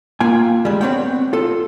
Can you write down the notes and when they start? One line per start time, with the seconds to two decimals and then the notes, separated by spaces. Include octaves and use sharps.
0.20 A#3 F4 G5 G#5
0.65 G3 G#3
0.81 B3 C4 C#5 D5 F#5 G5
1.33 F4 A4